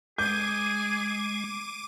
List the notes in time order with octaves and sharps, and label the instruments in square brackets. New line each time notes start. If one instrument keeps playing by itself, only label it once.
[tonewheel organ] G#3 [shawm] G#4 [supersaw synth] D6 D#7 [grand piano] G6